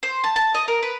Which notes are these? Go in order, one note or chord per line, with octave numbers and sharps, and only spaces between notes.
C5
A5
A5
D#5
A#4
B4